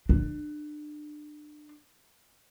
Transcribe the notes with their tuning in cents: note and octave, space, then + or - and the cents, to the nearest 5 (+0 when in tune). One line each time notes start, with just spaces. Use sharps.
D4 +30